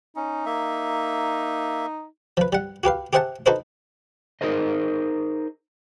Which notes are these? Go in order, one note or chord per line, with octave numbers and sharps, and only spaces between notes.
C#4 D#4
A#3 E5
F3 B4
G3 F#5
F#4 G4 B4 F5
G4 G#4 C5 E5 F#5 A5
D#4 F#4 A4 B4 C5 D#5
D#4 G#4 A#4 C5 D#5